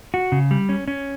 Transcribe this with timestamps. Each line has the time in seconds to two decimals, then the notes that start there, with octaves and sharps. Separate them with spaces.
0.14 F#4
0.32 C#3
0.51 G3
0.69 C#4
0.88 C#4